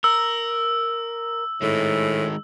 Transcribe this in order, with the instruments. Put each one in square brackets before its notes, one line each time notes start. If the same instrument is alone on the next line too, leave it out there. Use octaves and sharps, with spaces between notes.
[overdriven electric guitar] A#4 [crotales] E6
[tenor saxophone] A2 [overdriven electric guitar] D#3 G#3